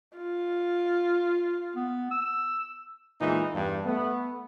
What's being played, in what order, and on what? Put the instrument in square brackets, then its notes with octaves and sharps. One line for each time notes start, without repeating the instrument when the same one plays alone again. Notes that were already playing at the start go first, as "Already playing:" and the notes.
[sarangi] F4
[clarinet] B3
E6
[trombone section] E2 A#2 E3 G#3 D#4
E2 G2
A3 B3